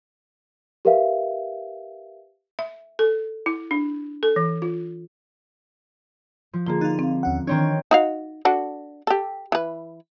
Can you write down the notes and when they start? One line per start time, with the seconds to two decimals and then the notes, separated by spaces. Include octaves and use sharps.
0.85 G4 A#4 B4 E5 F5
2.59 E5
2.99 A4
3.46 E4
3.71 D4
4.23 A4
4.36 E3
4.62 F4
6.53 F3
6.67 D3 A#3 F4 G#4
6.81 D#4 F4 F#6 A6
6.99 C4 F5
7.23 D#2 C#4 F#5
7.47 D#3 E3 C4 D4 C#5
7.91 D#4 F#4 F5
8.45 D4 F#4 A4
9.07 G4 A4
9.52 E3 B4